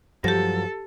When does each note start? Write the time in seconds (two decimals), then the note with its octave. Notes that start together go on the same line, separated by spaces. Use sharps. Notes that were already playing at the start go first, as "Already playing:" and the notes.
0.24 G2 F3 F#3 G4 A4 A#6